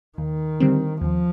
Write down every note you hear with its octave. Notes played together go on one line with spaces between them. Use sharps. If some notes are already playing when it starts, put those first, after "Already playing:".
D#2 D#3
D3 G3 C4
D#2 F3